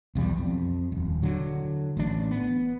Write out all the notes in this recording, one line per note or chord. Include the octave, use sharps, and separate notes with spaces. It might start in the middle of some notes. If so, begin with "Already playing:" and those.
B1 E2 G3
F2
D#1
D3 F#3
A1 D4
B3